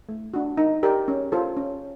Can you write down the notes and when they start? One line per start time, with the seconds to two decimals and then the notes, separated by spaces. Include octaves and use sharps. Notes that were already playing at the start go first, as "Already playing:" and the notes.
0.09 A3
0.34 D4 F#4
0.57 D#4
0.83 G4 A#4 D5 G5
1.08 C#4
1.32 F4 A4 C5
1.57 C#4